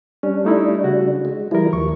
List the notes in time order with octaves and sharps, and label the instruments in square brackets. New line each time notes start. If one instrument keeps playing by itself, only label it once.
[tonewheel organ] G3 D4 [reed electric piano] C#4
[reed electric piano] A3 D#4 E4
C#3 F#4
[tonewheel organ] G#3
[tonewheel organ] E3 G3 E4 [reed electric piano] F3 A#4
[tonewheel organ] D#2 [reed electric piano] C#6